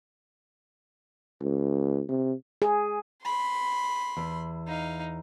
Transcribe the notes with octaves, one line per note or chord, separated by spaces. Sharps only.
C#2
C3
G#4
B5 C6
E2
D#4 F5